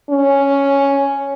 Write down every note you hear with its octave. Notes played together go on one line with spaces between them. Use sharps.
C#4